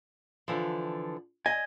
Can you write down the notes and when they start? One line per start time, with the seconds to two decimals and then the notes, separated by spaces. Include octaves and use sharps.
0.48 D3 E3 F3
1.46 D#5 G#5